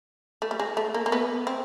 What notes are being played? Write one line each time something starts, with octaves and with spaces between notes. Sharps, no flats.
A3
G3
G#3
A3
A#3
A#3
B3
C4